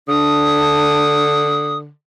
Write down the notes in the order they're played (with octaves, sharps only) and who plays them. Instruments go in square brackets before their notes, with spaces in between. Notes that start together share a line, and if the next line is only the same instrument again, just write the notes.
[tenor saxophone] D3 [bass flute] D4 [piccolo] D#6